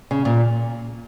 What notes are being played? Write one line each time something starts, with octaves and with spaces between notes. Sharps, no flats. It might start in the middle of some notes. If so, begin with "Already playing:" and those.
C#3
A#2